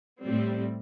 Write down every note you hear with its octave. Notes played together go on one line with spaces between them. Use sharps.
A2 G3 C4